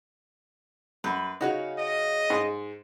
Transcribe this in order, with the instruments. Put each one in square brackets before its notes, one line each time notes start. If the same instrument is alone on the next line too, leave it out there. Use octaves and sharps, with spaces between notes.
[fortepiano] F#2 [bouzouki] B4
[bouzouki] C#3 C#5 F5 [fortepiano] D#4 F#4
[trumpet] D#5
[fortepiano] G#2